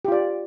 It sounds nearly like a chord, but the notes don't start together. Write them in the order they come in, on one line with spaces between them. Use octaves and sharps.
G4 F4 D5